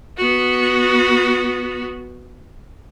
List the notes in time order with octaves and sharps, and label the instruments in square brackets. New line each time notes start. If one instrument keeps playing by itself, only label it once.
[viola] B3 F#4